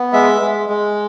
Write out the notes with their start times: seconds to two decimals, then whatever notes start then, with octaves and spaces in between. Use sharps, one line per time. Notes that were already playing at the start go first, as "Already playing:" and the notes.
Already playing: B3
0.13 G#3 E5
0.41 G#3
0.69 G#3